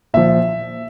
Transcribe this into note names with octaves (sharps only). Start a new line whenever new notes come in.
A#2 F3 E5